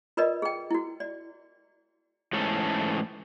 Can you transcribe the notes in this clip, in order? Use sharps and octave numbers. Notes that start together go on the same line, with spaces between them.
F4 A#4 B4 D5 D#5
G#4 G5
E4 F#4
D5
G#2 E3 A3 C#4 A4